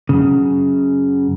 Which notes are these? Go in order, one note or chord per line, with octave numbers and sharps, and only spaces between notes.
F#2 A2 C#3